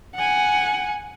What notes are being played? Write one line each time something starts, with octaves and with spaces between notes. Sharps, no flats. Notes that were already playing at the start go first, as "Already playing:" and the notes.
F#5 G#5